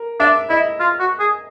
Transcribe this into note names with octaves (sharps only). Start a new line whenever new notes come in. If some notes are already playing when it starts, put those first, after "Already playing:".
Already playing: A#4
D4 E5
E4 D#5
F4
F#4
G#4